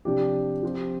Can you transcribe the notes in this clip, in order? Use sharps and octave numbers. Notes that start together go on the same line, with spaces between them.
C3 F3 D4 G4
F3 C4 G4